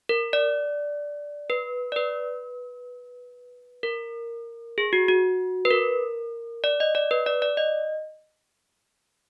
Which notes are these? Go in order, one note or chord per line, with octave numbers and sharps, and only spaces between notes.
A#4
D5
B4
D5
B4
A#4
G#4
F#4
F#4
B4
A#4
D5
D#5
D5
B4
D5
D5
D#5